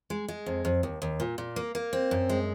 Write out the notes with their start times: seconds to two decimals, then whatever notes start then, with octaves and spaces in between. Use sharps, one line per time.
0.10 G#3
0.28 G#3
0.46 F2
0.65 F2
0.83 D#2
1.02 D#2
1.20 A#2
1.38 A#2
1.56 A#3
1.75 A#3
1.93 C4
2.11 F#2
2.29 G#3